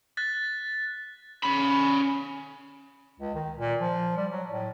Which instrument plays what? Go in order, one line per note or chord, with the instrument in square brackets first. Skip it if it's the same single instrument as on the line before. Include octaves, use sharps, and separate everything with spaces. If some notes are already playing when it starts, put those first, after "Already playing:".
[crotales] F#6 A6 B6
[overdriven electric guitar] C#4 B5
[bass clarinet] C#2
D#3
A#2
F3
G3
F#3
A2